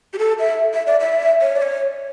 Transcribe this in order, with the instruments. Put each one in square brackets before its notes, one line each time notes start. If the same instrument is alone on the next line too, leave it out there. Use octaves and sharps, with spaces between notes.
[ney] G4
A4
E5
E5
D5
E5
C#5
D5
C#5